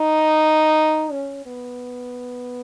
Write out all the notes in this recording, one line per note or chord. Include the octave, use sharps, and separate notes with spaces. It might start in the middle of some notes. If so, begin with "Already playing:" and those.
Already playing: D#4
C#4
B3